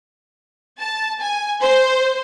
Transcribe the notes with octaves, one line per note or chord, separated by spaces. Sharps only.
A5
G#5
C5